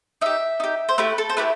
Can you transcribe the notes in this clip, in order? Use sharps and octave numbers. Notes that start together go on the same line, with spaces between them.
D#4 G4 E5
D#4 G4
C5
A3 E4 G4 B4
A4
C5
A3 E4 G4 B4